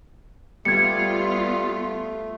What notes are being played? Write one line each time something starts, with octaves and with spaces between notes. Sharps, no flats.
G3 A3 B3 F4 G#6 C#7